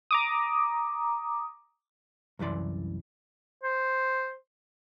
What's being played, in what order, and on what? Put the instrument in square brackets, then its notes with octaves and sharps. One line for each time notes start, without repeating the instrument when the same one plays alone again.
[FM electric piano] A#5 D6 D#6
[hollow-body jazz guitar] C2 F#2 E3 D5 C6
[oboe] C5